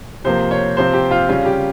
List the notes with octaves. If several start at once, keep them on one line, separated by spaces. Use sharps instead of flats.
C3 F3 A#3 C5
C#5
C3 F3 C4 C5
G4
F4
C#3 G3 C#4 F4
G4